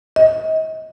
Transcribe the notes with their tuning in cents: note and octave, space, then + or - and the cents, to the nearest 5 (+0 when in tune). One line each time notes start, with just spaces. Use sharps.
D#5 +35